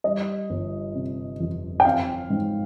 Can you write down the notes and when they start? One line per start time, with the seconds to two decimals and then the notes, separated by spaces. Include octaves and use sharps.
0.04 G3 D#5
0.50 G1
0.95 C3
1.40 F2
1.80 G5
1.85 C4 F5
2.30 G#2